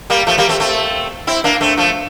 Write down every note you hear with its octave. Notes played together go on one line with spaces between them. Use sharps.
G3 A#3
F3 A3
G3 A#3
A3 C4
A3 C4
C4 E4
A#3 D4
A3 C4
F3 A3